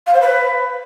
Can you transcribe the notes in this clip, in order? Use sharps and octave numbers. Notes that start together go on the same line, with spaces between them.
F5
C5
B4